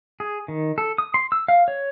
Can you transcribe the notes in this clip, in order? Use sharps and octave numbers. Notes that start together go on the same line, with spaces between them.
G#4
D#3
A4
D#6
C6
E6
F5
C#5